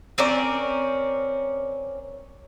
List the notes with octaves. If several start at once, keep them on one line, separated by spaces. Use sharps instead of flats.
C4 C#4 A#4 D5